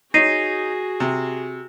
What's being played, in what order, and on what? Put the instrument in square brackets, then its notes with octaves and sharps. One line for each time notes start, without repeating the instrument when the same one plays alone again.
[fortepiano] D#4 C#5 [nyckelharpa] F#4 G#4 [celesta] A#6 C7 D#7
[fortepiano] C3